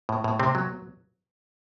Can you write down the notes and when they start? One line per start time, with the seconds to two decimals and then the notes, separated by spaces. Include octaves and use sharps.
0.09 A2
0.24 A2
0.39 C3 C4
0.55 F#3